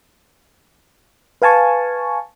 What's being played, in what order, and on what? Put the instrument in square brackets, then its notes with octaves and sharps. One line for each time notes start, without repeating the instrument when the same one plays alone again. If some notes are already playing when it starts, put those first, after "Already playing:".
[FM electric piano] B4 F5 G#5 A5 C#6